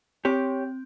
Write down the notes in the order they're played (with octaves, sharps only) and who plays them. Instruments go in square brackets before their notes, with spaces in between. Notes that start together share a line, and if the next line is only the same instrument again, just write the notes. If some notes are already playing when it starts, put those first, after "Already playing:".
[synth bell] C4 [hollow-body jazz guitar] G4 C#5